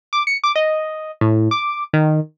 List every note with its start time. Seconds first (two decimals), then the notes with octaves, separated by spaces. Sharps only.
0.13 D6
0.27 C#7
0.44 D6
0.56 D#5
1.21 A2
1.51 D6
1.93 D#3